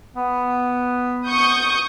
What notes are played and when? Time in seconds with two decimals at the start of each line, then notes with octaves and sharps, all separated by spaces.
0.16 B3
1.26 C#6 D#6 G6